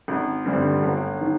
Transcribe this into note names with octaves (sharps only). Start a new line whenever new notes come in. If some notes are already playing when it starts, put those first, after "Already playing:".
G#1
G2 D3 G3 C4
G1
D#3